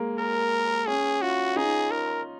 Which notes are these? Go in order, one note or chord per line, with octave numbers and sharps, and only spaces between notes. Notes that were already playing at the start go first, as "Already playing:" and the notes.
Already playing: G#3 A#3
A#4
C#4 G#4
F4 F#4
D#4 G#4
A#4